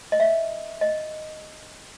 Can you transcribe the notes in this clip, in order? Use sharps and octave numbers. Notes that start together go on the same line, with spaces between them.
D#5
E5
D#5